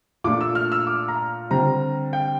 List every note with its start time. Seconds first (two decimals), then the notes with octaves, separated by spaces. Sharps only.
0.24 A#2 A3 D4 D6
0.41 E6
0.55 F6
0.72 E6
0.87 D6
1.08 A#5
1.50 D3 G3 C4 A#5
2.13 G5